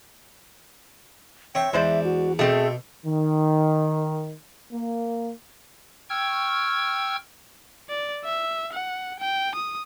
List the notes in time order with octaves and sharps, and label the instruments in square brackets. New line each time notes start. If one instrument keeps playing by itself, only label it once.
[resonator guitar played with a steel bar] C4 [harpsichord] C#5 E5 [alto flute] G5
[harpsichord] E2 [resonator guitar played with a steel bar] G#3 C5 D5 [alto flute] E5
[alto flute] F#4
[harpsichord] B2 [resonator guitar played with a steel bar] A3 C4 A4 [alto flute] G#4
[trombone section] D#3
A#3
[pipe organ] G5 C#6 E6 F6 G#6
[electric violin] D5
E5
F#5
G5
D#6